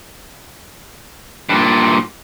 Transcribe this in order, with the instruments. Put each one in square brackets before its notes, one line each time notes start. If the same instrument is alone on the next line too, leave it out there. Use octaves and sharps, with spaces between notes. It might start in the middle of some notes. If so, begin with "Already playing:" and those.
[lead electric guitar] G2 A#2